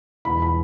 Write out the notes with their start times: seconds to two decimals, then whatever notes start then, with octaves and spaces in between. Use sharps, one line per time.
0.25 E1 B5
0.42 B5